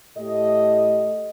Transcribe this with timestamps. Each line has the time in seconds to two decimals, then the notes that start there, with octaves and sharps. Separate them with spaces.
0.17 A2 A3 G4 D#5